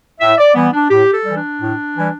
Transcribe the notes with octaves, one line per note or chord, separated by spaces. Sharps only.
A2 E5
D5
E3 G3 B3
D4
A2 G4
A4
E3 G3
D4
A2
E3 G3